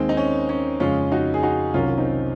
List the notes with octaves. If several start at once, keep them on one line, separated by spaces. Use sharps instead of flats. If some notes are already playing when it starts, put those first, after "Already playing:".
Already playing: D#2 D#3 G#3 C4
D#4
C#4
C#4
F2 C#3 G#3 C#4 F4
D#4 F#4
G#4
D#4 F#4
C2 C3 D#3 F#3 C#4 F4
C4 D#4